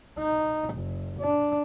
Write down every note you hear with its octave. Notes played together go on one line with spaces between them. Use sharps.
D#4
F#1
D4